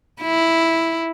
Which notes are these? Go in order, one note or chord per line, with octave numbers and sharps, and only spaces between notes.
E4